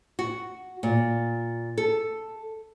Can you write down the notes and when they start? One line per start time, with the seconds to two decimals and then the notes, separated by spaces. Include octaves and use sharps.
0.19 F#4
0.83 A#2
1.78 A4